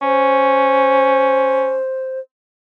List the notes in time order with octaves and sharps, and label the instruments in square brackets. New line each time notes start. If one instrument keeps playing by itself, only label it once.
[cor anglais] C#4 [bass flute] C5